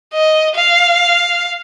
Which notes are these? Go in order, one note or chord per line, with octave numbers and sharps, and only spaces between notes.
D#5
F5